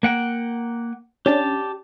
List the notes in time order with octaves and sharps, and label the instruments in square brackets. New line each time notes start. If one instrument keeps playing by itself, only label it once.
[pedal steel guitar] A#3 F#5 G5
[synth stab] C#4 D4 [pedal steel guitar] G4 A5